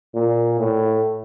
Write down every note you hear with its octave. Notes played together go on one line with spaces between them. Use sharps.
A#2
A2